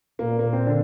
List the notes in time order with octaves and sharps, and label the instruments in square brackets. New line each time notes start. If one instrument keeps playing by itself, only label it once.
[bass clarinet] A#2 [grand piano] A#3
[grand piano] A#3
C4
D3 D4